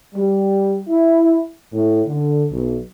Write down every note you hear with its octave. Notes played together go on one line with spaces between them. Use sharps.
G3
E4
A2
D3
B1